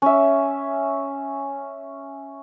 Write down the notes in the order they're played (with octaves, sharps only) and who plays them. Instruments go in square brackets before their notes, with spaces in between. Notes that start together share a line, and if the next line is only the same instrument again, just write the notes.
[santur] C#4 E5